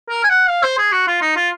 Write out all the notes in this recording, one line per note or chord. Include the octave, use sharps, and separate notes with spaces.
A#4
G#5
F#5
F5
C5
G#4
F#4
F4
D#4
F4